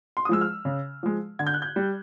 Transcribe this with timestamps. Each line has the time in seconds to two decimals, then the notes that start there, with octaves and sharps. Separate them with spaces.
0.17 C6
0.25 D#6
0.29 F3 G#3 E6
0.41 F6
0.65 C#3
1.03 F3 G#3
1.39 D3 G#6
1.47 G6
1.54 F#6
1.62 G6
1.76 G3